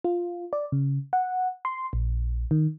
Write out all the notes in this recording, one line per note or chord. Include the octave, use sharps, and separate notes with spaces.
F4
D5
C#3
F#5
C6
A#1
D#3